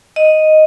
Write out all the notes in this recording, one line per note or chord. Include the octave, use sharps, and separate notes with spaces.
D#5